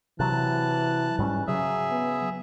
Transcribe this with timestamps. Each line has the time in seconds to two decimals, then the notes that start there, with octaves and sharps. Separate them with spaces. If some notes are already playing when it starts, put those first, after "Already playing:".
0.20 C3 E3 F#3 A5 F#6
1.19 G#2 G3 C#4
1.47 C#3 F#3 G#4 E5
1.91 B3